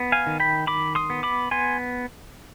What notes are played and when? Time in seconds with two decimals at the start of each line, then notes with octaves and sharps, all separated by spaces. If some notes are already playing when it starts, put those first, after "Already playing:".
Already playing: B3
0.12 F5 G#5
0.27 D#3
0.40 G5 B5
0.67 D#3 B5 D6
0.95 C6 D#6
1.10 B3
1.23 B5 D6
1.51 B3 G#5 C6